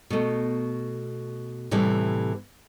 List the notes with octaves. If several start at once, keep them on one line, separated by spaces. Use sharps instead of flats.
B2 A3
A2 C3 E3 G3